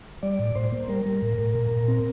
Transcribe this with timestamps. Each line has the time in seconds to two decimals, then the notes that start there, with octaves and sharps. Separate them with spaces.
0.23 G3 D5
0.39 A2
0.55 A2 C5
0.72 A#3
0.89 G3 A#4
1.06 G3
1.22 A2
1.39 A2
1.55 A#2
1.71 A#2
1.88 C4